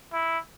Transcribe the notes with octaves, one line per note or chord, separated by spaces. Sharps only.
E4